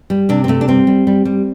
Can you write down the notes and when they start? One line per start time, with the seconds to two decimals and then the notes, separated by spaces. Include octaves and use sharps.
0.10 G3
0.29 C3 D4
0.44 C4
0.48 C3 A3
0.61 D4
0.68 G3 C4
0.87 G3
1.07 G3
1.25 G3